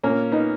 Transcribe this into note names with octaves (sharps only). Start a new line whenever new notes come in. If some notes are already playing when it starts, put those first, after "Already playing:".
A#2 A#3 C#4
B3 D#4